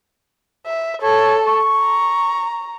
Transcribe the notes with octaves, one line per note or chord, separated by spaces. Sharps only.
E5
A4 C#5
C#6
A#5